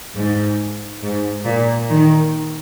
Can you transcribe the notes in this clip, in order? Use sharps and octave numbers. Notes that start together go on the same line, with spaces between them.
G#2
G#2
A#2
D#3